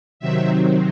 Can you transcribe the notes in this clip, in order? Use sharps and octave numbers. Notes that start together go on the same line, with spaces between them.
C3 D#3 F#3 C4 E5